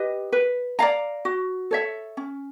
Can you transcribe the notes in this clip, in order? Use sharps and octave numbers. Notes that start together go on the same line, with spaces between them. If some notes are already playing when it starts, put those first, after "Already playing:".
Already playing: G4 B4 D#5
B4
D5 F5 A#5
F#4
A4 C#5 E5
C#4